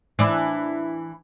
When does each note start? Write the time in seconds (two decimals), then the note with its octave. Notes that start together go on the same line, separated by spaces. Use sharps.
0.19 E3 D4 E4